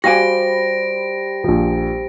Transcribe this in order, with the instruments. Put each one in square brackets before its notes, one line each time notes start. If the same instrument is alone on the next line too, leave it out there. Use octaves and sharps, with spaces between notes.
[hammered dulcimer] G3 C5 [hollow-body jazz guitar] F#4 F5 G#5 [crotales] A#6 D7
[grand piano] A#1 F3